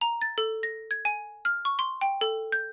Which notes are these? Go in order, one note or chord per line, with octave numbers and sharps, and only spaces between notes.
A#5
A6
A4
A#6
G#6
G#5
F6
C#6
C6
G5
A4
G6